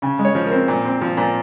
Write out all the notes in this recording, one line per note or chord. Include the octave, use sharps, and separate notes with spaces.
C#3 G#5
G#3
C#5
F3
C4 A#4
A#2
C4
F3
A#2